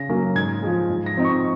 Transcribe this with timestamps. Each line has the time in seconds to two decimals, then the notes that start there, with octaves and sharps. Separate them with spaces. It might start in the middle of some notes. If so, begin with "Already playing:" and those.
Already playing: C#3 A#6
0.09 F#3 A#3 C#4
0.35 G#2 G#6
0.63 F3 G#3
0.89 G#2
1.06 A#6
1.16 F3 C4 D#4
1.25 C#6